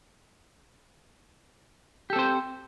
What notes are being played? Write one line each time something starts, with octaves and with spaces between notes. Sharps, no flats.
C4 G4 A4 C5